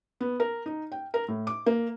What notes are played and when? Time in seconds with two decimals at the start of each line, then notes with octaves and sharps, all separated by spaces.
0.21 B3
0.40 A#4
0.66 D#4
0.92 G5
1.14 A#4
1.28 A2
1.47 D6
1.66 A#3